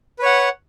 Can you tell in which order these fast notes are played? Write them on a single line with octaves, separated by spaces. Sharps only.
B4 C#5 F#5